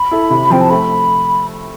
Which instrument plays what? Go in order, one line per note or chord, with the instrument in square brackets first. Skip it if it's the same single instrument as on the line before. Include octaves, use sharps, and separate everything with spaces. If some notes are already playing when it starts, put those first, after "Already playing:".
Already playing: [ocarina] B5
[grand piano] E4 A4
C3
[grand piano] F3 C4 [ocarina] G5
[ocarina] A5
[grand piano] A3 [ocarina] B5